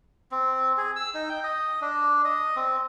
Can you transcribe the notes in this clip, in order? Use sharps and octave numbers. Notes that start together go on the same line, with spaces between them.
C4
G#4
E6
D#4
G5
D#5
D4
D#5
C4